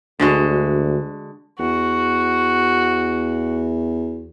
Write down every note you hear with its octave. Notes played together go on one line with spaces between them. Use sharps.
D2 D3 G#3 F#4
E2 F#4